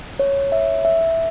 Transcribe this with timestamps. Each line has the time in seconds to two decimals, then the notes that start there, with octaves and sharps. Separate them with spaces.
0.19 C#5
0.52 E5
0.85 E5